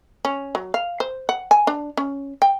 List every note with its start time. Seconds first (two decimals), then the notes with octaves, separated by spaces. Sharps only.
0.25 C#4
0.55 F#3
0.74 F5
1.00 C5
1.29 F#5
1.51 G#5
1.67 D4
1.97 C#4
2.42 G5